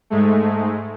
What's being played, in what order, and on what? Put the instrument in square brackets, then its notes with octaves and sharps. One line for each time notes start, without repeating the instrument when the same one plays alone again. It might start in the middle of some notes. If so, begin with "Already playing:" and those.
[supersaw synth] G#2 G#3 A3